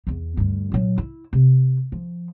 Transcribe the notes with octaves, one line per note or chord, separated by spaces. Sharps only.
E2 B3
D2 G2
A#2 F#3
E4
C3
F3